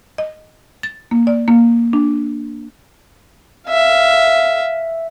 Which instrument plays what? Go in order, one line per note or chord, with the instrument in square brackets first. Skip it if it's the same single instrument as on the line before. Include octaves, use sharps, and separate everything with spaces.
[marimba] D#5
A6
A#3
D5
A#3
D4
[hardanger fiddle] E5 F5